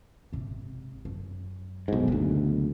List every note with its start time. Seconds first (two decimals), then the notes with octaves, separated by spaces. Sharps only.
0.33 G#1 C3
1.05 F#2
1.88 B1 G#2
2.08 F#1 D2 B3